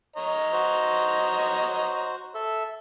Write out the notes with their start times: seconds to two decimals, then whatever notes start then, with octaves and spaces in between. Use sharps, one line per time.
0.16 C#5 D#5 A#5
0.53 F#4 C5
2.35 A4 E5